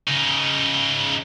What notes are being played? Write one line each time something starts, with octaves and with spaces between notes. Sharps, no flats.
C#3 D#4